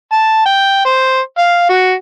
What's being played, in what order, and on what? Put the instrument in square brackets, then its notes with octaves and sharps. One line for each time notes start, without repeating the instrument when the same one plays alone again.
[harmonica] A5
G5
C5
F5
F#4